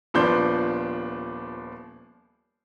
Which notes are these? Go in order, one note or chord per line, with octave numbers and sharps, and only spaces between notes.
D#1 F3 B3 D4 C6 G6